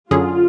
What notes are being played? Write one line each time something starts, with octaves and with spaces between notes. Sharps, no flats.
F#2 D3 F#3 C#4 F4 G#4